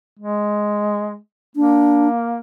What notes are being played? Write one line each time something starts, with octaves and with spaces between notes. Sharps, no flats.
G#3
A#3 D4